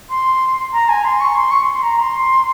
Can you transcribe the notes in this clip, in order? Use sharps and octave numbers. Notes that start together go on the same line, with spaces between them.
C6
A#5
G#5
C6
C#6
C6
C#6
C6
C6
A#5
C6